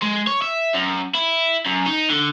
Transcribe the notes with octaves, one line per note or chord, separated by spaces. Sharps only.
G#3
C#5
E5
F#2
E4
F#2
D#4
D3